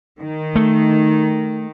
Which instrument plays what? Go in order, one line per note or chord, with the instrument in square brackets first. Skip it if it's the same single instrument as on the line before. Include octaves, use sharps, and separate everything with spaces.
[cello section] D#3
[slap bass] A3